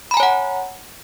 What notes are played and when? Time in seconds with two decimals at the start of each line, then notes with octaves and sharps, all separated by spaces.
0.11 B5
0.14 A#5
0.17 G#5
0.20 C#5
0.23 F#5